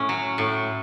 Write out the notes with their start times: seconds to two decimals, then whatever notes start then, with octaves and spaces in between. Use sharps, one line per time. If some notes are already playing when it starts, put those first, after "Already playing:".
Already playing: A2 C#4
0.09 F#3
0.38 A2